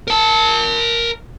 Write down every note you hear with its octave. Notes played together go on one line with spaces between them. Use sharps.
A#4 A5